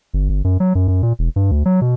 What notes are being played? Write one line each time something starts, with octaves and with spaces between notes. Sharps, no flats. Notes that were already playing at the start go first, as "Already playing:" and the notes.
G1
G1
F#2
F#3
F#2
F#2
A#2
E1
G2
D2
F#3
B2